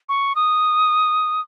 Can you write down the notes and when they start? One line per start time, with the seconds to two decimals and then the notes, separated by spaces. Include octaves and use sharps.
0.09 C#6
0.36 D#6